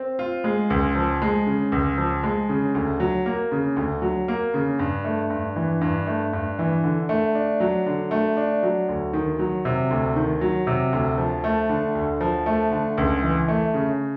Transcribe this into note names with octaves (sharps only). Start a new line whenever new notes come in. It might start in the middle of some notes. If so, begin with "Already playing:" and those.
Already playing: C4
F4
G#3
C#2
F3
G#3
C#3
C#2
F3
G#3
C#3
D2
F#3
A#3
C#3
D2
F#3
A#3
C#3
G2
A3
G2
E3
G2
A3
G2
E3
D3
A3
D4
F#3
D3
A3
D4
F#3
D2
D#3
F#3
C3
D2
D#3
F#3
C3
D2
F3
A3
D3
D2
F3
A3
D3
C#2
E3
A3
C#3